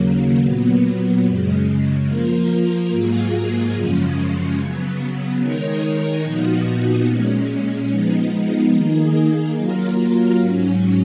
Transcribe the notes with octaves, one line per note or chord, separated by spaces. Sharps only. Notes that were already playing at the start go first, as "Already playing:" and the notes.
Already playing: D#2 C#3 F#3 A#3
A#2 F#3 B3
F#2 C#3 G#3
F3 A#3 F4 A#4
G#2 F#3 A#3 F4 G#4
F#2 C#3 F3 G#3 C#4
C#3 F#3 B3
D#3 G#3 D#4 A#4 C#5
A#2 F3 B3 D#4 F#4
A#2 G#3 C#4
F3 G#3 B3 D#4
D#3 A#3 D#4 G#4
F#3 A#3 F4 A#4
G#2 F#3 C#4